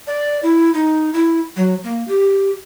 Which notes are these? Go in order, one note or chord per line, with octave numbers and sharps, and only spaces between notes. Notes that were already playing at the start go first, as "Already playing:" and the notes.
D5
E4
D#4
E4
F#3
A#3
G4